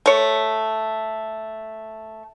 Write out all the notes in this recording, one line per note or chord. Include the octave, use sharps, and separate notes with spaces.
A3 C#5